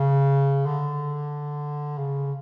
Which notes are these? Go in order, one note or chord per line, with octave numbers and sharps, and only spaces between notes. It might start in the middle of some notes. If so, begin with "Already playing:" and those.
Already playing: C#3
D3
C#3